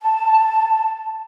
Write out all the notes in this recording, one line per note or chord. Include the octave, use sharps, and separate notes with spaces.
A5